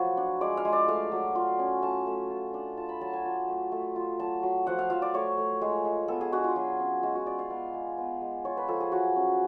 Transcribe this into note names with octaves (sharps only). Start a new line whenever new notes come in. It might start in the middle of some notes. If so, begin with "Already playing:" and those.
Already playing: F3 F#3 A3 F4 B4 C#5
D4
G#3 D5
F5
G#3
D5
A3 F5
F#3
F4
C#4
A3 A5
A3
F4
D4
F4 A5
B5
F#3 A5
G#5
F4 A5
A3
A3
F4
F#3 A5
F#3
F3 F#5
F5
F3 F5
D5
A3 C#5
A3
G#3
G#3
B3 A4
G#4
D4 F#4
F4
F#3
C#4
G#3 F#4
F#4
F4 D5
F5
B3 F5
G#3
B3
G#3
F4 C#5
B4
F3 A4
G#4
F#3 F#4
C#4